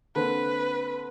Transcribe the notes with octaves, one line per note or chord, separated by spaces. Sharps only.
D3 A#3 C4 B4